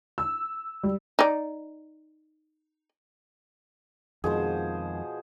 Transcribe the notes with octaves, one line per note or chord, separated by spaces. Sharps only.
E6
G3
D#4 D5
F2 B2 D#3 F3 G#3 G#4 C5